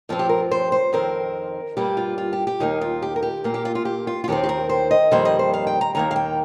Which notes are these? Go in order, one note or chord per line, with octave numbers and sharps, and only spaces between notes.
G2 F3 C4 F4
G4
A#4
C5
C5
F2 D#3 C4 A#4
G2 G3 A#3 G4
F4
F4
G4
G4
D#2 D#3 A#3 D#4
F4
G4
A#4
G4
A#2 A#3
G4
F4
F4
G4
F4
F4
D#2 D#3 C4 G4
G4
A#4
C5
D#5
F2 D#3 G3 A#3 C5
D#5
C5
F5
G5
A#5
D#2 D#3 A#3 A#5
F5
G5